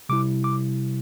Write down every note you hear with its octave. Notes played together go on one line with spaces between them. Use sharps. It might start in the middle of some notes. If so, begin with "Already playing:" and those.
C3 G3 E4 D6
D6